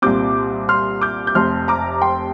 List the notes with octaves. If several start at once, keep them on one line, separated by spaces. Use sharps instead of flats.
C2 A#2 G3 C4 D6 G6
C6 F6
D6 G6
G6
F1 F2 C3 C6 F6
A#5 D6
G5 C6